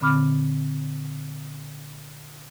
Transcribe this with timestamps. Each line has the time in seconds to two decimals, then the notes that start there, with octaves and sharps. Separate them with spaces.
0.01 A#2 D3 C4 B5 D6 F6